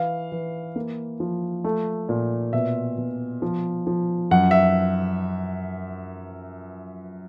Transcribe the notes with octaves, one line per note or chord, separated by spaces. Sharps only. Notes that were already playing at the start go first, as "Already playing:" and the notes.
Already playing: E3 F5
E3
A#3
F3
A3
A#2
B2 E5
B2
F3
F3
F#2 F#5
E5